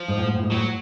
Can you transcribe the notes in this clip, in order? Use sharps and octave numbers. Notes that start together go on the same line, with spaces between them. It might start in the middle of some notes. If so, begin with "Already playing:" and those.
Already playing: F3
G#2
A2
G#2
A2
G#2
A2 F#3